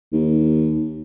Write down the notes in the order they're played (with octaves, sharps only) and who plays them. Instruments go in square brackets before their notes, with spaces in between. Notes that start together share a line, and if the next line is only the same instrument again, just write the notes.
[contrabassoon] D#2